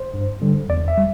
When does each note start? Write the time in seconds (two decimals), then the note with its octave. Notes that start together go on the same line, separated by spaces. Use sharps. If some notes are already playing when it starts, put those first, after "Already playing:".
Already playing: C5
0.14 G2
0.41 D3 G3
0.69 E2 D5
0.88 E5
0.97 G3